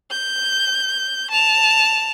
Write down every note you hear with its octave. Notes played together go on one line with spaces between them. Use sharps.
G6
A5 F7